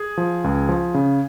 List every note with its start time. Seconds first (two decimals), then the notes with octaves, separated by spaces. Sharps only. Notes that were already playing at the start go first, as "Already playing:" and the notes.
Already playing: G#4
0.17 F3
0.44 C#2
0.69 F3
0.94 C#3